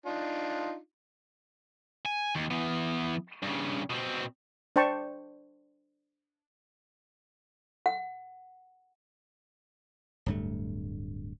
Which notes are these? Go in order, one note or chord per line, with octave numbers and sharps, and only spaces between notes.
D4 D#4 F4
G#5
D#2
E3 B3
G2 C#3
B2 C4
D4 C5 G5 A5 C#6
F#5
D1 G2 A3